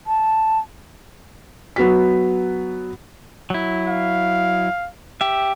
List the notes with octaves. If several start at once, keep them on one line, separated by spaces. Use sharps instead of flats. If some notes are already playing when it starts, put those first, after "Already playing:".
A5
F#3 B3 F#4 B6
F#3 E4
F5
G4 E5